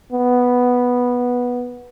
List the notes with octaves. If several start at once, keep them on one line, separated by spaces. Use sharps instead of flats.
B3